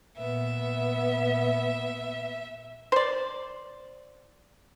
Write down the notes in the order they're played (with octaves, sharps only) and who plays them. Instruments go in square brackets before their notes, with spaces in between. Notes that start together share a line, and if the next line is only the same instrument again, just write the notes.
[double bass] A#2 B3 [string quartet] E5
[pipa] C5 D5